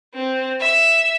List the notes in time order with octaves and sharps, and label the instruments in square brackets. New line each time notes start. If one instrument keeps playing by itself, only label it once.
[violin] C4
E5